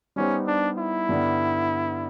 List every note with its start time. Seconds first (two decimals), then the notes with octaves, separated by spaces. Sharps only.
0.16 G3 B3 C#4 D#4 G4 C5
0.47 D4
0.78 E4
1.09 G2 D3 G3 B3